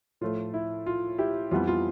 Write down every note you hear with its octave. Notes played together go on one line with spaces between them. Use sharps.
A2 F3 A3 F4
E4
F4
E4 G4
F2 E3 G3 B3 F4
F4